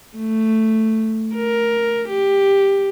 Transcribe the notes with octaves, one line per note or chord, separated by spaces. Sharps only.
A3
A#4
G4